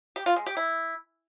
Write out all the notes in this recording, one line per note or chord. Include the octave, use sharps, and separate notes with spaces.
G4
F4
G#3
G4
E4